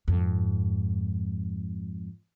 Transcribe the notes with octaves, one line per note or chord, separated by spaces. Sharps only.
F2 G#2